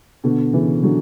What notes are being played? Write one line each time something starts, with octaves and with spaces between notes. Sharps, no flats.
B2 D3
C#3 E3
D3 F#3